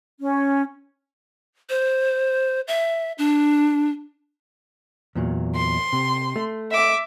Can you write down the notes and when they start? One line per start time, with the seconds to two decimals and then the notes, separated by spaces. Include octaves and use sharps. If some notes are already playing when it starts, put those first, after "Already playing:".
0.20 C#4
1.69 C5
2.68 E5
3.18 D4
5.15 E2 A#2 F#3
5.55 C6
5.93 C3
6.36 A3
6.71 E5 D6